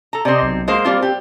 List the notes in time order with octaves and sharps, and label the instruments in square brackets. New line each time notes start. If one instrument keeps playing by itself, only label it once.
[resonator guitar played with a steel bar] A4 A#5
[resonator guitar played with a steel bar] C3 C4 [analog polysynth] D5 D#5 C6
[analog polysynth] B1
[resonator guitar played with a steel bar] G#3 A#3 C5
[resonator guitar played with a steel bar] G3 A#3 F4 [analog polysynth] C4
[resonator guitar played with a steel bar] G4